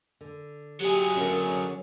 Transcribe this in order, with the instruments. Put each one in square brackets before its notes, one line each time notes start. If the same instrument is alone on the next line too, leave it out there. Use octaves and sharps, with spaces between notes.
[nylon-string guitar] D3
[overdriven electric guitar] F#3 G#4 [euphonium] G4
[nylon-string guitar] D3 A#4 F#5 [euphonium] C#4